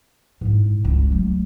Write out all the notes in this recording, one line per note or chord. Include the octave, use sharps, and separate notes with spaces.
G#2 E4
F1 C#2
F#3 A3